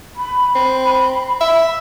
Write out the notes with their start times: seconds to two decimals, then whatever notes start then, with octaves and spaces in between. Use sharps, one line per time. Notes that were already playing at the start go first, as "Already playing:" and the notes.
0.16 B5
0.55 C4
1.41 E5